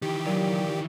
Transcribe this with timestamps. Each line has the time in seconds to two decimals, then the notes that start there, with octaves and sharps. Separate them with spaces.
0.02 D#3 E3 G4
0.26 A#2 F#3